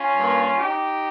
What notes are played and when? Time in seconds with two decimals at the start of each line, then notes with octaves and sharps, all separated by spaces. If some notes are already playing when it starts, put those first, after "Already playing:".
Already playing: C#4 F4
0.17 G2 G3 A#3
0.58 D#4 G4